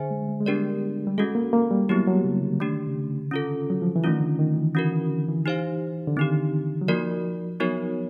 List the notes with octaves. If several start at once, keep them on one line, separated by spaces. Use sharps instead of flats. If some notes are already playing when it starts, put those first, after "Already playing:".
Already playing: D3 G#4 C5 E5 G#5
G#3
G#3
G#3
G3 B3 D4 G4 A#4 D5
G3
G#3 C#4 F#4 A4
A#3
A#3
G3
F#3 B3 E4 G4
F#3
C#3
D3
D#3 A3 D4 G4
D3
C#3
D3
C#4 F4 A4
F#3
F3
E3
D#3 A3 C#4 F4
D3
D#3
E3
E3 C#4 F#4 A#4
E3
D3
E3
D#4 G4 C5 F5
D3
D#3 C4 D#4 G4
F#3
F3 A#3 D#4 F#4 A#4 D5
F#3 B3 D#4 F#4 A#4 C#5